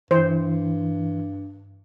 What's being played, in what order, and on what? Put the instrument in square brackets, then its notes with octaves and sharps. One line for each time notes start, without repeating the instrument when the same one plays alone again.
[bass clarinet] G2 [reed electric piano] E3 [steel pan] C5